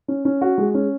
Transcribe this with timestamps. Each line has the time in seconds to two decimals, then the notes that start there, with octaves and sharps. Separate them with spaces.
0.08 C#4
0.25 C#4
0.42 F#4
0.58 G#3
0.74 C#4